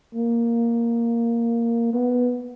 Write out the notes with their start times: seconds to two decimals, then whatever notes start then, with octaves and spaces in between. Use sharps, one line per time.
0.15 A#3
1.93 B3